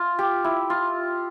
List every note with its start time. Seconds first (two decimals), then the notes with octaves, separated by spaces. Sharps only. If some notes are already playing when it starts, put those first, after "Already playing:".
Already playing: F4
0.19 G4
0.44 E4
0.70 F4